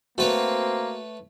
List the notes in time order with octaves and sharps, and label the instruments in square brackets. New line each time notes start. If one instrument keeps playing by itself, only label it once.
[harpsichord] A3 B4 C#5 [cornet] A#3 [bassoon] C4 [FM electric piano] F#4